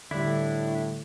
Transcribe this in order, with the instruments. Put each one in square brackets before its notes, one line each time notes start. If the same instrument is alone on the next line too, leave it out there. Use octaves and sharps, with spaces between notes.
[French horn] A2 [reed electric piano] D3 G3 [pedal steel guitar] D4 E4